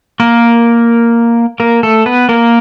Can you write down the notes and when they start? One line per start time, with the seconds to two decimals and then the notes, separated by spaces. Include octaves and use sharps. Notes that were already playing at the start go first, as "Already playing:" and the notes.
0.20 A#3 A#4
1.60 A#3 A#4
1.83 A3 A4
2.06 B3 B4
2.29 A#3 A#4